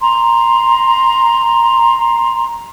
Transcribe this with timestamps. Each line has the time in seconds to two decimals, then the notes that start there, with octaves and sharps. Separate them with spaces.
0.01 A#5 C6